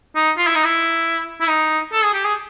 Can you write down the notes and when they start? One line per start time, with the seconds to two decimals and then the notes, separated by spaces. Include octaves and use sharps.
0.16 D#4
0.38 F4
0.47 E4
0.55 D#4
0.65 E4
1.41 E4
1.48 D#4
1.93 A4
2.04 G#4
2.14 G4
2.25 G#4